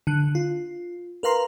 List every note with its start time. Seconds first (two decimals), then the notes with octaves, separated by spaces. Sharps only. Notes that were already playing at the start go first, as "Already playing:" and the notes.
0.07 D3 F#6
0.35 F4
1.23 A#4 B4 F5 A#5 C6